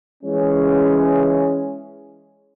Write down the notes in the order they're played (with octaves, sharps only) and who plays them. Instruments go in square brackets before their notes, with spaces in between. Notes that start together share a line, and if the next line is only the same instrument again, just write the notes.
[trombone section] E3 G#3 C#4